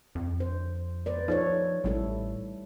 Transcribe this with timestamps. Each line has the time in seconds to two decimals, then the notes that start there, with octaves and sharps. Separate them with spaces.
0.15 F2
0.40 D4 C5
1.06 B4 C5 D5
1.28 F3 D#4 A4 C#5
1.84 A1 G3 E4 A4